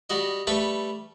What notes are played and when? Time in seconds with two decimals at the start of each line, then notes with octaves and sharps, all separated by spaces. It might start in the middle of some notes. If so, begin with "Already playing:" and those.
0.10 G3 F#4 D#5
0.47 G3 A3 B4 B5 C#6